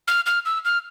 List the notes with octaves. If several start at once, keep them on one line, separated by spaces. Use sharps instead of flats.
F6
F6
E6
F6